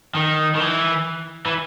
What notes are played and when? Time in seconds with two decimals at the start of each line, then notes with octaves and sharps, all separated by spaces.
0.15 D#3
0.55 D#3
0.60 E3
1.46 E3